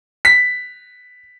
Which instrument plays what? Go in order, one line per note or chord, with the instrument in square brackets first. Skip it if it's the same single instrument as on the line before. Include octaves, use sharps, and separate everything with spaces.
[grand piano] B6